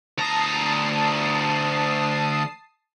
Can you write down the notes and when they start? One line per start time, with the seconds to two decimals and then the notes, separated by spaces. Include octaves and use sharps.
0.18 D2 A5 A#5 D#6 C7